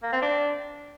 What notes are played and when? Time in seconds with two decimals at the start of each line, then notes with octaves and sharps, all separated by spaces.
0.03 A#3
0.12 C4
0.22 D4